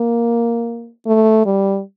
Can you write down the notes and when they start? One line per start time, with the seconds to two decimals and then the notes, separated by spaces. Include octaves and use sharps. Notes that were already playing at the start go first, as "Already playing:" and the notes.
Already playing: A#3
1.07 A3
1.46 G3